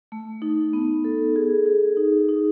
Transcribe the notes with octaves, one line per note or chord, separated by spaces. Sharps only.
A3
D#4
B3
A4
G#4
G#4
D#4
D#4